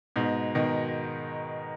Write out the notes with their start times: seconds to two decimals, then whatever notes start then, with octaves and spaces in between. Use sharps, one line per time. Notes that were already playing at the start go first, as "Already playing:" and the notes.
0.16 G#2 B2
0.55 B2 D#3